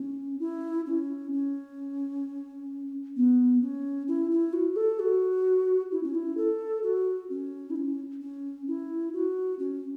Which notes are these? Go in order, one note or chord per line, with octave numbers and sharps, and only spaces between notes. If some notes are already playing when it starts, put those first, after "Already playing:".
Already playing: C#4
E4
C#4
C#4
B3
C#4
E4
E4
F#4
A4
F#4
E4
C#4
E4
A4
F#4
C#4
E4
C#4
C#4
E4
F#4
C#4